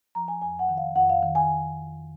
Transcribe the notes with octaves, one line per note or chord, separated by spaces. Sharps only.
F3 A#5
G#5
F2 G#5
F#5
D#3
F5
F2 F#5
F5
D#3
G#5